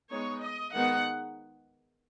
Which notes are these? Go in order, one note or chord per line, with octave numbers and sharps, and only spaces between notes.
G#3 B3 D#4 C#5
D#5
D#3 G#3 B3 D#4 F#5